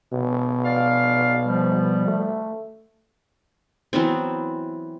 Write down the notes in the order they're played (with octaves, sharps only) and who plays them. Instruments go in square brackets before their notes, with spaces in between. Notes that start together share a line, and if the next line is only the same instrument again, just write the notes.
[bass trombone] B2
[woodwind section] D5 F5
F3 G3
[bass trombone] A3
[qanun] E3 F#3 B3 C4